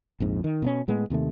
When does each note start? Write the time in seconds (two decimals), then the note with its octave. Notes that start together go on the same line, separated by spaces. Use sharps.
0.20 A#1 F2 G#2
0.44 D#3
0.62 B2 A#3 C#4
0.88 A2 G#3 B3
1.10 D#2 C3 D#3 A3